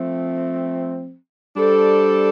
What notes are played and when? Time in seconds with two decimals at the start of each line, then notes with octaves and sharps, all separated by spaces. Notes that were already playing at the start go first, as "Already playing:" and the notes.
Already playing: F3 A3 C4
1.55 G3 D4 A4 C5